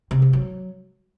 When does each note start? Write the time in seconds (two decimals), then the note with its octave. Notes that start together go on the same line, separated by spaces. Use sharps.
0.11 C3
0.22 D#3
0.33 F#3